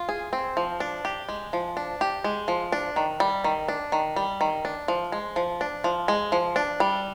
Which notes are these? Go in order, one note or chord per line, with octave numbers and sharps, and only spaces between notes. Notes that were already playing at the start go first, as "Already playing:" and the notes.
Already playing: F4
G#4
C4
F3
D4
G4
G#3
F3
D4
G4
G#3
F3
D4
D#3
G3
D#3
D4
D#3
G3
D#3
D4
F3
G#3
F3
D4
F3
G#3
F3
D4
G3